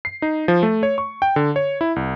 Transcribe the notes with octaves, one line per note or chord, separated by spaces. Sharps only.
C7
D#4
F3
A3
C#5
C#6
G5
D3
C#5
E4
C2